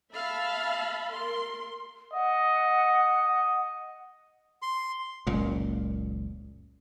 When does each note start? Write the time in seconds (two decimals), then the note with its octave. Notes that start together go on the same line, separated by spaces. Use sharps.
0.11 E5 F5 A5 B5
1.12 A#4 C6
2.14 D#5 F#5
4.62 C6
5.27 F#1 C#2 A#2